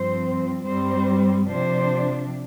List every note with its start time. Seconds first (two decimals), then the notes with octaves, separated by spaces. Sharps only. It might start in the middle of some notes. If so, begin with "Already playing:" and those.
Already playing: G2 F3 C4 C5
0.66 G2 G3 C4 C5
1.49 C3 F3 D4 C5